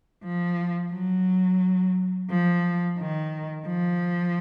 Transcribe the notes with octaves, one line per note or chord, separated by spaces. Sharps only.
F3
F#3
F3
D#3
F3